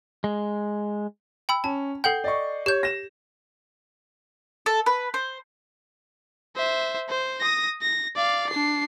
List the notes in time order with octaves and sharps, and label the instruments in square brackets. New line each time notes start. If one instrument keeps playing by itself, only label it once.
[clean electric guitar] G#3
[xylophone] G5 B5 E6
[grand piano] C#4 [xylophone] A5
[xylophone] A4 F#5 G5 [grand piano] G6 C7
[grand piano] D5 D#5 C#6
[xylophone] G4 G6 [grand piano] C#5
[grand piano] A#6 E7
[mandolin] A4
B4
C5
[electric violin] C5 E5
C5
D#6 A#6
A#6
D5 F5
D4 C7